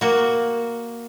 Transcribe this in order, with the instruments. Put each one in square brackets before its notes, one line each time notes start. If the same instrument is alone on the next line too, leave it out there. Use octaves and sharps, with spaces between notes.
[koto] A#3 F#4